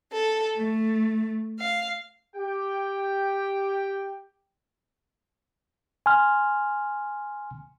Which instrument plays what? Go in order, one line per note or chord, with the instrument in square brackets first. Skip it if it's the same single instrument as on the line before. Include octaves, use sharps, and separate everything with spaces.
[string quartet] A4
A3
F5
[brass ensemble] G4 G5
[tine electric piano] G#5 C6 F6